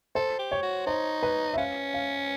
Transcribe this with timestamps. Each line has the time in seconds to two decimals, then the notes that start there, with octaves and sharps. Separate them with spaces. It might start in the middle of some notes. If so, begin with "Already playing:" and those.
0.15 A4 C5
0.39 G4
0.52 C#5
0.63 F#4
0.86 D#4 C5
1.23 B4
1.54 E5
1.57 C#4 F5
1.94 F5